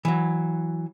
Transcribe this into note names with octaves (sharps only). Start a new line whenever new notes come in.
E3 F#3